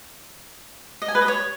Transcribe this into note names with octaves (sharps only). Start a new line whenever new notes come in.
D#5
G#5
B4
D#5
C#5